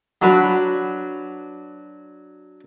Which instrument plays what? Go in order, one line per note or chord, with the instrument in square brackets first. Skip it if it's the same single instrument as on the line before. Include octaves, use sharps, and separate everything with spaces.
[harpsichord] F#3 D4 F#4 B4